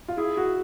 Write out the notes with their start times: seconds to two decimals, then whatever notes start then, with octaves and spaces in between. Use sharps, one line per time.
0.08 F4
0.17 E4 G#4
0.37 F#4